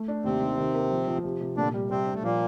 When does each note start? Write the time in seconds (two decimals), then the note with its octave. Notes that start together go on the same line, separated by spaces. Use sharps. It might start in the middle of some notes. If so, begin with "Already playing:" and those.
Already playing: A3
0.08 D4
0.25 D#2 C3 C4
0.42 D#3
0.58 D#3
0.74 A#3
0.90 F3
1.07 F3
1.24 C3
1.41 C3
1.57 A#2 D3 D4
1.74 G3
1.91 C3 G3 C4
2.06 D4
2.14 A3
2.23 A#2 F3 A#3